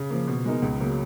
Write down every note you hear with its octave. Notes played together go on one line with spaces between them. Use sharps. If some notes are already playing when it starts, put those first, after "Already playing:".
Already playing: C#3
F3 A#3
B2
G#3 B3 D#4 A#4
C#2
C#3 F#3 A#3